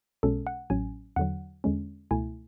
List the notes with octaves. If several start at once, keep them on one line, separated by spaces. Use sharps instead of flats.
B1 B2 G#3 C#4 A4
F#5
A1 A2 F#3 C#4 G#5
E2 D3 F#3 F#5
E2 D3 G#3 C#4
C#2 B2 A3 E4 G#5